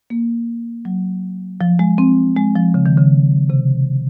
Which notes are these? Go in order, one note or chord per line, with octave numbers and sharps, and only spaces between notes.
A#3
F#3
F3
G#3
C4
G#3
F3
C#3
D#3
C#3
C3